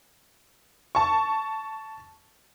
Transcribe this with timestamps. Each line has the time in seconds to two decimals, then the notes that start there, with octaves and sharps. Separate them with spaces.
0.95 A5 C#6